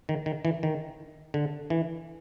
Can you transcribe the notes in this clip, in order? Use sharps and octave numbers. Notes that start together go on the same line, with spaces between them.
D#3
D#3
E3
D#3
D3
E3